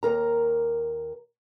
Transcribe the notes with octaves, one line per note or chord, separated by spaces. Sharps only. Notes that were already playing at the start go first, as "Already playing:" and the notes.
D#2 A#4 A#5